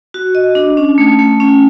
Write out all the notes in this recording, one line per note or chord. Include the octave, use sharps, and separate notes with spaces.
F#4
D#5
D4
C#4
A3
A3
C#4